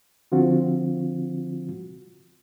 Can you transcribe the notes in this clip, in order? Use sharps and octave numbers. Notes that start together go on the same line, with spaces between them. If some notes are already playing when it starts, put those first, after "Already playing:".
D3 F3 C4 F4 F#4